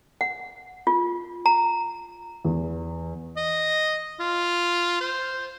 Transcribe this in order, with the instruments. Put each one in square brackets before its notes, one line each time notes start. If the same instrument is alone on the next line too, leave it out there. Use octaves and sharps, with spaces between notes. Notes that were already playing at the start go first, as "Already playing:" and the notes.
[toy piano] F#5
F4
A#5
[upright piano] E2
[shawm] D#5
F4
C5